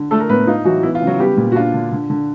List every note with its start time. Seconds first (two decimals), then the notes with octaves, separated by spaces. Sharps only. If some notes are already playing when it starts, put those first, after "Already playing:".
Already playing: D3
0.11 A3 D4 A4
0.20 A#4
0.29 A2 B3 B4
0.47 D#4 F4
0.65 E3 F#3 F#4
0.83 B3 E4
0.95 F4
1.02 C#3
1.07 F#3 F#4
1.19 G3 B3 G4
1.37 A#2
1.52 F#4
1.56 D4 F4
1.74 D3
1.92 D3
2.10 D3